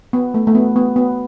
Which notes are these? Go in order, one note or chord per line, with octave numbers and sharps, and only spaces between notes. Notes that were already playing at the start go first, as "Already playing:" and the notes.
B3
A3
A3
B3
B3
B3